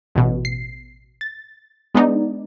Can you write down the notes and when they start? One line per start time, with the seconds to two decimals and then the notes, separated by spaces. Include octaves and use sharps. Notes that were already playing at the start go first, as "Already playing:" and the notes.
0.15 A1 B2
0.45 C7
1.21 A6
1.95 G#3 B3 D4 D#4 D5